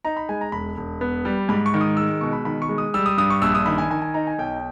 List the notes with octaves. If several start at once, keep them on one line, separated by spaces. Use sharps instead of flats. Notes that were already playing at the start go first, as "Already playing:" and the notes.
D#4 A#5
B5
G#3 G#5
A#5
E1 B5
E1
B3
G3
G#2 B5
C#6
D#3
D#6
G#3 E6
B2 C#6
B5
D#3 B5
C#6
G#3
D#6
G3 E6
D#6
G2 D#6
C#6
A#1 E6
D#6
D#3 B5
G#5
D#3 G#5
G#5
D#4 A#5
G#5
B1 G5